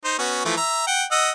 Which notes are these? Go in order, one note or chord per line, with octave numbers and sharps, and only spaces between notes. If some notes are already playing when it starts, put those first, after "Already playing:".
D#4 C5
B3 C#4 F#4
E3 F3 A3
E5 A#5
F#5 G5
D#5 F#5 E6